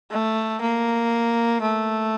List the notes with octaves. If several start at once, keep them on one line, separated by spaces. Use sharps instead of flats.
A3
A#3
A3